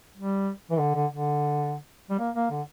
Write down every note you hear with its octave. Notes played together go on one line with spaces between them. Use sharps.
G3
E3
D3
D3
D3
G3
A#3
A#3
D3